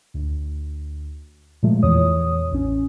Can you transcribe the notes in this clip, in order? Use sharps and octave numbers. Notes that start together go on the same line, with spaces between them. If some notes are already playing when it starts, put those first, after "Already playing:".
D2
A#2 F3 G#3 A3
E2 E3 C#5 D#6
A1 C#4